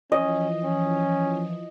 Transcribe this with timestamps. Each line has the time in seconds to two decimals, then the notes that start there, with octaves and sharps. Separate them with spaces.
0.12 E3 F3 C#4 D#5
0.64 C#4